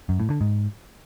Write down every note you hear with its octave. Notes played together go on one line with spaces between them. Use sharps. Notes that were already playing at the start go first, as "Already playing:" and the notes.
F#2
A2
D3
G#2